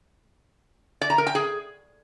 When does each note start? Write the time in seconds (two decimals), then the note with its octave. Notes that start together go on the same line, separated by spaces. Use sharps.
1.01 D5
1.10 A#5
1.18 A#4
1.27 G5
1.35 G#4